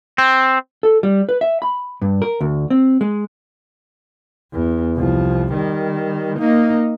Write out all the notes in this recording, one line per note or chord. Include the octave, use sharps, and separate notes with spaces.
C4
A4
G3
B4
E5
B5
G2
A#4
D2
C4
G#3
E2
C2 F3
D#3 G3
A#3 D#4